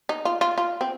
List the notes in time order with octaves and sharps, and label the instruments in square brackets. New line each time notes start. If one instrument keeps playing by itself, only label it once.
[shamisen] D#4
F4
F4
F4
C4